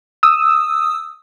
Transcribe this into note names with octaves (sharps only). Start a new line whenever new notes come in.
D#6 E6